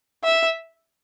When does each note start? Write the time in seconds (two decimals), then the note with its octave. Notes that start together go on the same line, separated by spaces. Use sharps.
0.24 E5